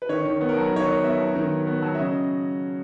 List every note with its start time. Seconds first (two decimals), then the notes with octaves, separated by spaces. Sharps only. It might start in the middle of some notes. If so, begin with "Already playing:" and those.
0.02 B4
0.09 D#3 C#5
0.25 D#3
0.41 B3
0.49 A#4
0.57 F#3
0.63 B4
0.72 D#3 C#5
0.88 D#3 D#5
1.04 B3 E5
1.20 F#3
1.35 D#3
1.51 D#3
1.67 B3
1.82 F#3
1.95 E5
1.99 C#3 D#5